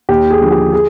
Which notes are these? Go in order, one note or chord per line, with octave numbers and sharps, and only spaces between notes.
D#2 G4
G#4
D3 F3
G4
G#4